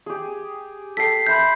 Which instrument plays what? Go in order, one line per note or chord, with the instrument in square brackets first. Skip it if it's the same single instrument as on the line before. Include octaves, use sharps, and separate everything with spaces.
[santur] G4 G#4
[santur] A4 G5 [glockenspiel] B6 C7
[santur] E5 B5 C6 [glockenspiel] G6